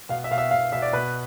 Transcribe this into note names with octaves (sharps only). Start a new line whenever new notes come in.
B2 F5
E5
B2 F5
E5
B2 F5
B2 E5
D5
B2 B4